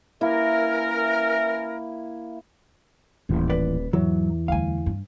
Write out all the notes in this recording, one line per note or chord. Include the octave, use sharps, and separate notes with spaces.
E3 A#3 C#4 E4 A#4
D#1 A1 E3
B4 D5
E2 G#2 E3 F#3
D2 G3 F5 G#5
G2